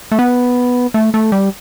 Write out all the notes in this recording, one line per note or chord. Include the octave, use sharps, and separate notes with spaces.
A3
B3
A3
A3
G3